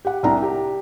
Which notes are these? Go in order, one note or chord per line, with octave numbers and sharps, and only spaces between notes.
G4 F#5
C2 D4 A#5
G4